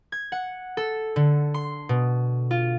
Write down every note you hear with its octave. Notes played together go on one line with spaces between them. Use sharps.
G#6
F#5
A4
D3
C6
B2
F4